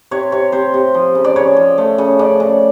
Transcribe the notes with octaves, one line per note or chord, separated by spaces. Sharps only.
C3 C#5
C3 C#5
C3 C5
C3
F3
C#3
D5
C#3 C#5
F3
A3
C#3
C#3 D5
C#3